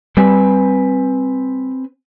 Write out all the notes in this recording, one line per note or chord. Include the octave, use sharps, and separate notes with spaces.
G3 C4 B4 G#5